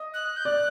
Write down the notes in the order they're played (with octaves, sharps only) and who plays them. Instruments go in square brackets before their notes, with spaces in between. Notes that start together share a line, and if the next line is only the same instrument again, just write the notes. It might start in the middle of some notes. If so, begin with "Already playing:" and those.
Already playing: [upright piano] D#5
[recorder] F#6
G6
[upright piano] D5 [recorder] F#6